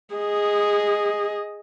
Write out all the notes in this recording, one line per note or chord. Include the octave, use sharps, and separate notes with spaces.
G#4 D#5